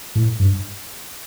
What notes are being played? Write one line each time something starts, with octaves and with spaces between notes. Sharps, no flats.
A2
G2